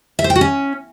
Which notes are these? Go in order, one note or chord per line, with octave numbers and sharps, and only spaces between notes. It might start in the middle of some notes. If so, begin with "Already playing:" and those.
E5
C5
G5
F#4
C#4